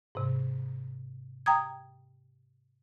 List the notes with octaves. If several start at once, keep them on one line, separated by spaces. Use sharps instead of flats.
G#2 C3
G5 A#5 D#6 G#6